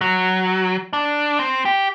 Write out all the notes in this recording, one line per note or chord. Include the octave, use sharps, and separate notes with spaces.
F#3
D4
C4
G4